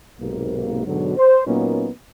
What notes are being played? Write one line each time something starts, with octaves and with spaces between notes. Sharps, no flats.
B1 G#2 C3 A#3
G#2 B2 D3 F#3
C5
A#2 F#3 A#3 B3 C#4 D#4